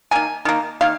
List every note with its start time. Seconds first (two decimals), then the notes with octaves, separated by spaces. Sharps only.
0.11 D#3 A#3 G#5
0.45 D#3 A#3
0.81 D#3 A#3 F5